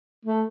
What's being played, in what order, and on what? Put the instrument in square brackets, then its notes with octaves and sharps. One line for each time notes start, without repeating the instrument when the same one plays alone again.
[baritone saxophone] A3